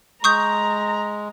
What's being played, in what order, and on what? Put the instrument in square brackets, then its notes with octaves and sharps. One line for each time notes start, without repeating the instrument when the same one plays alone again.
[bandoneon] G#3 [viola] A#5 [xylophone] C#6 D#6 G6